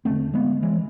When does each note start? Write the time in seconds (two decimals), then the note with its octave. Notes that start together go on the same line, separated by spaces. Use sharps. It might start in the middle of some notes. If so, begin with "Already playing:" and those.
0.05 E2 D3 A3 C4
0.34 G#3 B3
0.62 E3 G#3